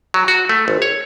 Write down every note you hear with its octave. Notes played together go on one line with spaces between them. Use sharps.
F#3
F#4
A3
G#1
C#5